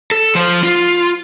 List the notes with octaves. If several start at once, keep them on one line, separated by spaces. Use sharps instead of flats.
A4
F3 C5
F4